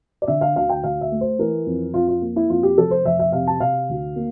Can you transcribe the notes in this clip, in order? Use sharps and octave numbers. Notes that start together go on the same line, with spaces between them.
D5
D3 E5
F5
D2 F5
G5
D2 F5
E5
A3
C5
E3 A#4
F2
F2 F4
F4
A#3
E4
F2 F4
G4
F1 A4
C5
F1 E5
E5
C3 F5
A5
C3 F5
D2
A#3